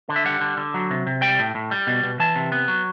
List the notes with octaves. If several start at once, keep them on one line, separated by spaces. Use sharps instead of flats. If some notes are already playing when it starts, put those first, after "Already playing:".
D3
E5
G3 F#5
D3
D3
F#3
C3
C3
G3 G5
A2
A2
G3
B2
B2
E3 A5
C3
B3
F#3